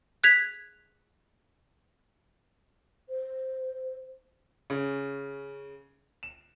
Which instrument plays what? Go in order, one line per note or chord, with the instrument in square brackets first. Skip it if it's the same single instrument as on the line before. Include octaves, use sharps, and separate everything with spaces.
[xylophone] F#6 G#6 B6 F7
[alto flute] C5
[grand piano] C#3
E7